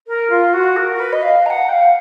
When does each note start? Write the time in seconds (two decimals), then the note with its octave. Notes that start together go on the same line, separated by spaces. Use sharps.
0.07 A#4
0.30 F4
0.53 F#4
0.76 A#4
0.99 B4
1.12 D#5
1.22 F5
1.46 A#5
1.50 F#5
1.68 G5
1.72 F5